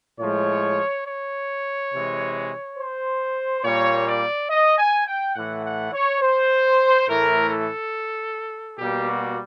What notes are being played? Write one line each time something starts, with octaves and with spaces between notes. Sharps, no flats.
A2 F3 G#3 C#5
C#5
C3 E3 G#3
C5
A#2 G3 A#3 C#5
D5
D#5
G#5
G5
A2 E3 A3 F#5
F#5
C#5
C5
A2 E3 A3 A#4
A4
B2 G3 A#3 G4
F#4